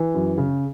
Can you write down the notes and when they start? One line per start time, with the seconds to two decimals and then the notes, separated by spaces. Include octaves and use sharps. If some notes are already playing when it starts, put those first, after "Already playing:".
Already playing: E3
0.14 F#2
0.38 C#3